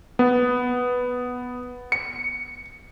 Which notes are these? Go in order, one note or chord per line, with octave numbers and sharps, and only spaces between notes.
B3
C#7